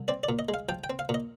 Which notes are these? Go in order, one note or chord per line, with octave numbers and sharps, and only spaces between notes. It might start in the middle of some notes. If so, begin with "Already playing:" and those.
Already playing: C2
C4 D5
D5
A#2
D#5
G#3
F5
F3 G5
G5
C4
F5
A#2
D#5